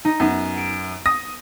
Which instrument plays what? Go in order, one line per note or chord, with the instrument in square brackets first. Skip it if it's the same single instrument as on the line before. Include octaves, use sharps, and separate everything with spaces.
[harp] D#4 D#7
[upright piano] F#2 [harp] B3 D#4
[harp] D7
[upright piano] D#6 A#6